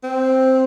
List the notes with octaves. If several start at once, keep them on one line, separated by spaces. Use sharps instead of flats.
C4